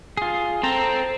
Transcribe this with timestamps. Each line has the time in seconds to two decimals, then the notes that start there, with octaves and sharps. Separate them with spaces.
0.17 F4 G#4
0.63 C4 A4 A#5